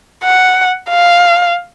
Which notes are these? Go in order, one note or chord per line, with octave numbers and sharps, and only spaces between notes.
F#5
F5